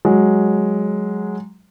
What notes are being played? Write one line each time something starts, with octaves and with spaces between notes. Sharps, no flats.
F#3 G#3